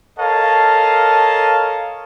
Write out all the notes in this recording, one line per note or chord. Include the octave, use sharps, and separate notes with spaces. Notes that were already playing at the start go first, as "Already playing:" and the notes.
A4 A#4 C#5 D#5 F5 A5